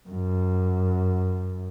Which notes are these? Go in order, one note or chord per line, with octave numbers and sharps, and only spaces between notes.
F#2